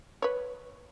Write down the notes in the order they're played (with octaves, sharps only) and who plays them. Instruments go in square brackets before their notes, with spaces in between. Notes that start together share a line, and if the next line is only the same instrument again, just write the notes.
[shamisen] B4 C#5